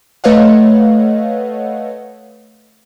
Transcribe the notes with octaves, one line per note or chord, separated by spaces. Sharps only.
A3 B4 C#5 D#5 F5 F#5